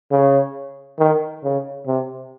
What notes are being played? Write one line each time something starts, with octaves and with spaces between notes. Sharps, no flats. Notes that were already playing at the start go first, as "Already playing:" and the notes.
C#3
D#3
C#3
C3